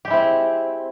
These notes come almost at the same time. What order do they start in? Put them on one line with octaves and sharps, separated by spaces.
G4 G#3 E4 C4